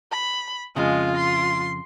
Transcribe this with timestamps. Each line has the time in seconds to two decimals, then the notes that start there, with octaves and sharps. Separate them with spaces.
0.12 B5
0.76 F2 C#3 G#3 F4
1.17 C6